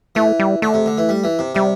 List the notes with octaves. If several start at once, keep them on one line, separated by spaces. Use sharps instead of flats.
E3 A3
G3
D3 A3
C3
D3
E3
G3
E3
C3
C3 G3